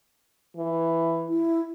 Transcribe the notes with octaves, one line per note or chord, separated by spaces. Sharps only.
E3
E4